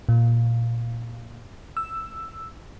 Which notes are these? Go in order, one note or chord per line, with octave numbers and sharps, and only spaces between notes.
A#2
E6